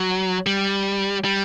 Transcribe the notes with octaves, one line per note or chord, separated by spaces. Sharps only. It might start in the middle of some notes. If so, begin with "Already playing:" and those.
Already playing: F#3
G3
G3